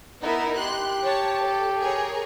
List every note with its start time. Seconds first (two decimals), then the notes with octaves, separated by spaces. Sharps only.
0.22 B3 D#4 E4 A#4
0.57 G4 C6 F#6
1.04 C#5 A5
1.44 A4
1.80 G#4 A#4 C#5